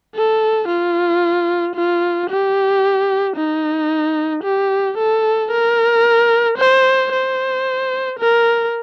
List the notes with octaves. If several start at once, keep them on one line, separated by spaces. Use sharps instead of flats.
A4
F4
F4
G4
D#4
G4
A4
A#4
C5
C5
A#4